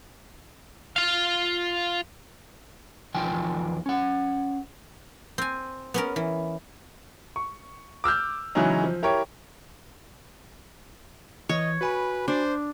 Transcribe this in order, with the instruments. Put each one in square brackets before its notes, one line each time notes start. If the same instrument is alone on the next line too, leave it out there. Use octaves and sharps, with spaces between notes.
[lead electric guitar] F4 F5
[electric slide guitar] E2 D#3 F3 F4 G5 G#5
C#4 F#5
[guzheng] C4 G#5
B3 C#4 A#4
E3
[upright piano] C#6
D6 E6 F6 G6
C#3 E3 F#3 G#3 C#4 D#4
F3
E4 G4 A#4 C#5
[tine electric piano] E3 [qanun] C#5 [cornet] D#5
[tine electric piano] F#4 G#5 B5 [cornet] B4
[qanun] D4 [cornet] C5